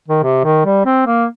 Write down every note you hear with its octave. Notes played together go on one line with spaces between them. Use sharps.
D#3
C3
D#3
G3
C4
A#3